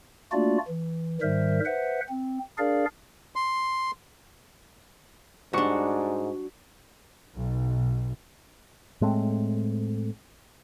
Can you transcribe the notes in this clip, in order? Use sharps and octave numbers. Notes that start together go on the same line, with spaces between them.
A3 A#3 D4 F4 F#4 D5
E3
G#2 D#3 G3 A#4 C5 E5
B4 C5 E5 F#5
C4
D4 G#4 A#4 D5 F5
C6
G#2 G3 D4 F#4 C#6
B1
A2 G#3 A3 C4